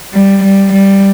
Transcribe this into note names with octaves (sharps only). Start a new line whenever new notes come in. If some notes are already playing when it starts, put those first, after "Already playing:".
G3
G3
G3